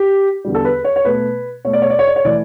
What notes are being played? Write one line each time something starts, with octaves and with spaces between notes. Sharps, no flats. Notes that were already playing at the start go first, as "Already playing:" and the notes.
Already playing: G4
E2 D3 G3
A4
B4
C#5
C#5
B2 A3 B4
B2 A3 C#5
D5
C#5
D5
C#5
D5
C#5
E3 A3 D5